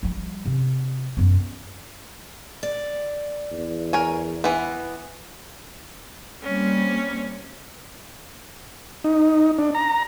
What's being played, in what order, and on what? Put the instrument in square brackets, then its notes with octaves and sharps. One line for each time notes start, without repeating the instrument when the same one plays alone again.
[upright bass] F3 G3
C3
F#2 B3
[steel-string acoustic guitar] D5
[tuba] E2
[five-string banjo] A#4 C#5 G#5
E3 B3
[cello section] G3 A#3 C4 [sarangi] C#4
[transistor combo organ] D#4
D4
A#5